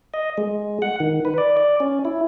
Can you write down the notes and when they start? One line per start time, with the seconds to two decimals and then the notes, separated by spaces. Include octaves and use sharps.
0.14 D#5
0.38 G#3
0.82 F#5
1.00 D#3
1.25 B4
1.38 D5
1.57 D5
1.80 C#4
2.05 E4